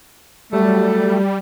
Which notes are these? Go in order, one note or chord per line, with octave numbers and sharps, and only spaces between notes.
F#3 G3 A3